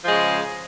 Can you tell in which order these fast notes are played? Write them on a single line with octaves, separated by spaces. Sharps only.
F3 G#3 C#3